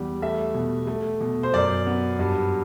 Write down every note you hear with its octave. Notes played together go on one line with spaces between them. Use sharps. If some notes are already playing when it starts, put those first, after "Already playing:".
Already playing: E2 G3
A3 E5
B2
A3
B2
C5
F#2 D5
B3
G2